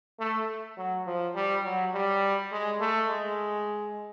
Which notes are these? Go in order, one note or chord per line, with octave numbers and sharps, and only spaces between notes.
A3
F#3
F3
G3
F#3
G3
G#3
A3
G#3